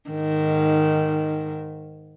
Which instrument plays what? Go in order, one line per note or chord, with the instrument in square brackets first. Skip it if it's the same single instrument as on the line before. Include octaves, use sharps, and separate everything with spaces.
[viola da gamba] G#2 D#3